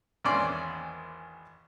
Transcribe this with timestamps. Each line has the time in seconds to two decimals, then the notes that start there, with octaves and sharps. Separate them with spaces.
0.25 G#1 E2 A#3 C#4 D5 C6